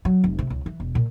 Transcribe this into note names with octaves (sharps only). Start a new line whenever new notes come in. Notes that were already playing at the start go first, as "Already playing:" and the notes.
F#3
F1
C3
C#2
E3
E1
A#2